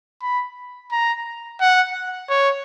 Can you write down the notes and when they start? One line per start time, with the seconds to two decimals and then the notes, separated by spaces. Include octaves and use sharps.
0.22 B5
0.92 A#5
1.60 F#5
2.29 C#5